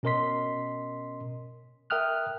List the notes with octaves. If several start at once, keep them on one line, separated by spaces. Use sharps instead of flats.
B2 C#4 A#4 D#5 C6 B6
A#4 E5 G5 D#6 F6 F#6